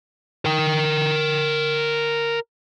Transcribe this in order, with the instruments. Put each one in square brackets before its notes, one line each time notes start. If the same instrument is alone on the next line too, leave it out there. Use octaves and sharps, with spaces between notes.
[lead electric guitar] A#4 G5